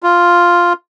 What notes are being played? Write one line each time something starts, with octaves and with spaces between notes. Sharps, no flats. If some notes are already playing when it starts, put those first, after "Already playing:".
F4